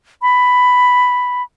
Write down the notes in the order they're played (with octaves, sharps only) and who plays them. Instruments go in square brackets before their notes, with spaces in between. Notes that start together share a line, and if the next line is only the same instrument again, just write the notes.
[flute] B5